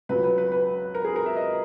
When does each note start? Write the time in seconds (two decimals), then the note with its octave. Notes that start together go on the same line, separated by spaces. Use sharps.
0.09 C#2 C#3 F#3 B4
0.24 B4
0.38 B4
0.52 B4
0.95 A#4
1.05 G#4
1.16 A#4
1.26 E5
1.36 D#5